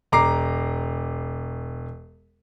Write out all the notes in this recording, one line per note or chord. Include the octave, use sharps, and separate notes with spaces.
E1 A#5 D6 C7